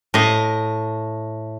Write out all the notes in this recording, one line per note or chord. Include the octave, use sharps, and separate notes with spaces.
A2 D#5